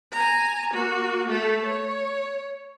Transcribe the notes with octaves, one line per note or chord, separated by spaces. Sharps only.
G#5 A#5
A#3 F#4
A3 A4
C#5